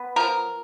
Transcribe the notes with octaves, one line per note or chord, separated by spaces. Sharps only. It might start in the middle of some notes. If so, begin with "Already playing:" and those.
Already playing: B3
F3 A#4